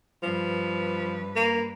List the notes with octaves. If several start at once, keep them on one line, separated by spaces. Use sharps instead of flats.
G2 F3 B4
A#3